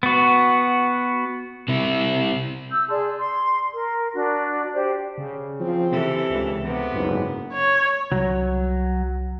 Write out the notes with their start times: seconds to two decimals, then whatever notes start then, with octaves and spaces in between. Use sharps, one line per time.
0.03 B3 F#4
1.68 C3 E4
2.71 E6 G6
2.89 G#4 D5 A5 C6
3.19 C6
3.74 A#4
4.14 D4 F#4 D5
4.74 G4 C5 D5
5.18 C#3
5.60 F3 C4
5.91 C3 E3 A4
6.30 C#2 G2
6.64 C3 B3
6.94 F#1 G#2
7.53 C#5
8.12 C2 F#3